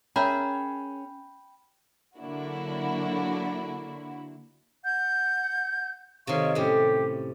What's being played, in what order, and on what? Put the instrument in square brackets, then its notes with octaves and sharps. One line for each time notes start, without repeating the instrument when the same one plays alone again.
[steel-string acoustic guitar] C#4 [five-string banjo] G#4 A#4 E5 [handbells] G5 B5 G6
[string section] D3 F#3 A#3 D4 E4 F#4
[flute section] F#5 G6
[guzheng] C3 D#3 [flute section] C#5 F5 C#6
[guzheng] A2 C3 C#4 [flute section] G4